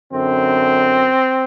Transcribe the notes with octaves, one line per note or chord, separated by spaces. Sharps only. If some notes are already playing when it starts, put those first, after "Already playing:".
F#2 D3 C4